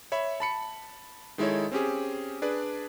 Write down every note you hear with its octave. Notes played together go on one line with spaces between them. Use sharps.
C#5 E5 B5
A5 B5 C#7
D#3 G#3 E4 A4 C#5
C4 C#4 G4 G#4
D4 G#4 B4 D5